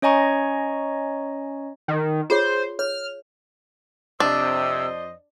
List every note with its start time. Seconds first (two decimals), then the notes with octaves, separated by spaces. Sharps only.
0.02 C#4 C#5 D#5 G#5 A#5 C#6
1.88 D#3
2.30 F4 G#4 C5 C#5
2.79 C#5 F6
4.20 F2 C3 D4 C5 D#5 E6